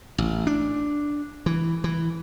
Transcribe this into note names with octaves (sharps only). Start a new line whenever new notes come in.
A1
D4
E3
E3